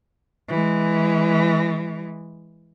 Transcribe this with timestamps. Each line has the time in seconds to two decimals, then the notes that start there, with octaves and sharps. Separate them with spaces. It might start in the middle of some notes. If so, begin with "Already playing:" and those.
0.49 E3 G#3